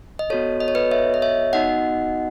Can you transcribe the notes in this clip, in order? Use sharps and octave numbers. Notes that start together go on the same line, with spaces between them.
D#5
B3 F#4 A4 C#5
D#5
C#5
B4 D#5
C#5 E5
D#5
C#5 E5
B3 D#4 F#4 D#5 F#5